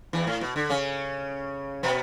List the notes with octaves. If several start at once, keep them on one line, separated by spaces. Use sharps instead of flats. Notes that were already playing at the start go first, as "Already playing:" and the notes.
E2 E3
A2
B2
D3
C#3 C#4
B2 B3